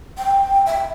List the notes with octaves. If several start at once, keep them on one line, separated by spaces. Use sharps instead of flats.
G5
E5